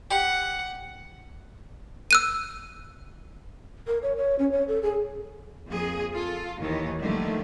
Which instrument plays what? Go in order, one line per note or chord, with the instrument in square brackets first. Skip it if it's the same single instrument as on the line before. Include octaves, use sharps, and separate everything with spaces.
[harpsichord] G4 [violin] F#5
[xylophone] E6 F#6 D#7
[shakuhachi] A#4
C#5
C#5
C#4
C#5
A4
G#4
[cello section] F2 A#3 G#4
F4 A4
D#2 D#3 E3 C#5
D3 D#3 F3 G3 A3 A#3